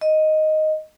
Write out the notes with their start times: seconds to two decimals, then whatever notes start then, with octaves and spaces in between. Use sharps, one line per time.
0.01 D#5